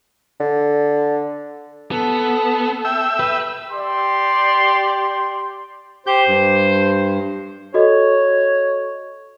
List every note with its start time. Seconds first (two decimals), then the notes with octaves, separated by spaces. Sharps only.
0.40 D3
1.92 B3 A4
2.85 E5 G5 E6
3.20 B4
3.71 G4 D5 C6
6.07 G4 C5 G6
6.28 G2
7.74 F#4 A4 C#5 D#5